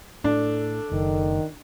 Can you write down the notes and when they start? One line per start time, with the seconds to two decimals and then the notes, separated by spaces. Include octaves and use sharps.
0.24 A2 D4 A4
0.92 F#1 D#3